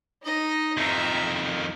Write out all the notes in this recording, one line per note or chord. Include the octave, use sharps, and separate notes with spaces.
D#4 D#5
F2 D#3 E5 A#5